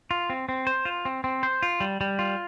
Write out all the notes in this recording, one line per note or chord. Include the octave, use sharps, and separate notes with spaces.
F4
C4
C4
C5
F4
C4
C4
C5
F4
G3
G3
F4